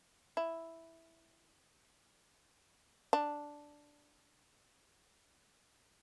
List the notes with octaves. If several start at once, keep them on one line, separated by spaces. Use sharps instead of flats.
E4
D4